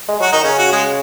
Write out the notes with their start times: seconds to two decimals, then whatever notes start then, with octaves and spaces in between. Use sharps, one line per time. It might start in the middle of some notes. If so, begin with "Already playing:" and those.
0.08 G#3
0.20 F#3 F#4
0.33 D#3 D#4
0.44 C#3 C#4
0.58 F#4
0.73 G#3